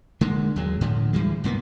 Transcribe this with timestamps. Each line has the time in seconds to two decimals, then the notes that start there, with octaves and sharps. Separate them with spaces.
0.21 D3 G#3 A#3
0.56 D#2 F#3 G#3
0.81 A2 D3 F3
1.13 D2 E3 G3 G#3
1.44 C2 G#2 A#3 B3